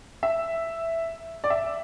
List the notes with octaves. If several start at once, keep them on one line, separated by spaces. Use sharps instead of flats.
E5
D5
E5